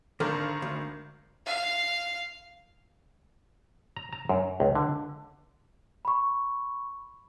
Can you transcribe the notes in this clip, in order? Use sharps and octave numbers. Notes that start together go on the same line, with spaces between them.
G#1 D3 A#4
D2
F5
A#5
A#5
F#2
C#2
D3
B5 C#6